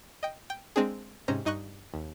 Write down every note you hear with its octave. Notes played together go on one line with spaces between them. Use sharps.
D#5 G5
G5
G#3 C4 D4 G#4
G#2 C3 C#4 C5 A#5
G2 D#4 D#5 C#6 F#6
D#2